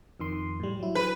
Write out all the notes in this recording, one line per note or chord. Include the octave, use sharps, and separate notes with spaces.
F2 D#3 C6
A2 G3
F#3 E4
B4